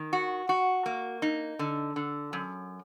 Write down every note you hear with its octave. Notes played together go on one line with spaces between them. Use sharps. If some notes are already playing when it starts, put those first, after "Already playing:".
Already playing: D#3
F#4
F#4
A#3
D#4
D3
D3
F#2